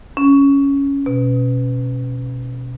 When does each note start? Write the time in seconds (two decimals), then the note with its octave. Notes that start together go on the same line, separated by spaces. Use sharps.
0.17 C#4
1.06 B2